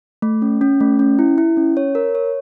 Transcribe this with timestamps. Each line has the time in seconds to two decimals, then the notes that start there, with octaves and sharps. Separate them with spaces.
0.22 A3
0.42 C#4
0.61 C#4
0.80 A3
0.99 C#4
1.19 E4
1.38 E4
1.57 C#4
1.77 C#5
1.95 A#4
2.15 C#5